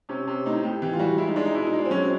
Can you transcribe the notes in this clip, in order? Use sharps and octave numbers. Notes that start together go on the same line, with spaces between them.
C3 C#4
C3
A2 D#4
A2 G4
E3 G4
F4
G3 F#4
G#3 E4
D#4
G#3 D4
D#4
B2 E4
D#4
G#3
D4
C4
F#3 C#4
C4